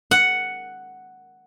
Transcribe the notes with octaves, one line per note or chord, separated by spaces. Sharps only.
F#5